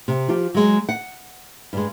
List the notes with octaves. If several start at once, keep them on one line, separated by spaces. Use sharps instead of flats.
C3
F3 F4 G4
F#3 G#3
F#5
G2 G#3